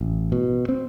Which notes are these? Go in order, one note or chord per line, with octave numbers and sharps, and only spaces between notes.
A1
B2
C4